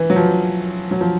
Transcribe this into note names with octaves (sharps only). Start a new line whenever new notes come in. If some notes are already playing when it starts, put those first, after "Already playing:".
Already playing: E3
F#3
F3
F#3
F3